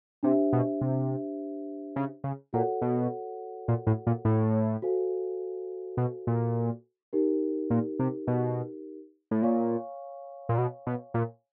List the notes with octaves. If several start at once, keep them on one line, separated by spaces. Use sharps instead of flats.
C3 D4 G4 C5 E5
B2
C3
C#3
C#3
A#2 F#4 A4 C#5 F#5
B2
A#2
A2
A#2
A2
F#4 A4 C5 F5 G#5
B2
A#2
D#4 G4 A#4
A#2
C3
B2
A2
A#2 C#5 F5 G#5 C#6
A#2
B2
B2
A#2